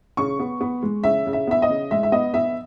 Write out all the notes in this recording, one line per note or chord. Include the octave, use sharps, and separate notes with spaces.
C#3 C#6
B3
B3
G#3
C#3 E5
C#3
E5
B3 E5
D#5
C#3
G#3 E5
E5
B3 D#5
B3 E5